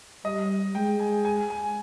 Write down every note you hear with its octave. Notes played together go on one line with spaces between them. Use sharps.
G3 D#5
G#3 G5
G#5
G#5
G#5